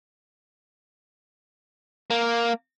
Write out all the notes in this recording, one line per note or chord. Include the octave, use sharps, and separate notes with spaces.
A#3